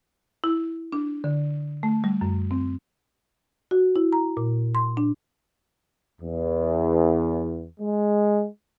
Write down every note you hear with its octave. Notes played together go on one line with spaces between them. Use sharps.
E4
D4
D3
A3
G3
F#2
C4
F#4
E4
A#5
A#2
C6
D4
E2
G#3